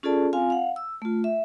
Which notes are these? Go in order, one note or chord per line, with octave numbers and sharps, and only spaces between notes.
C#4 F4 G#4 A4 D5 A5
C4 F4 F5 G#5
F5 F#5
E6
A3 F4
E5